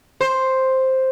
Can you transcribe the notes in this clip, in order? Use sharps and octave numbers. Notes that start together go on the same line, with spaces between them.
C5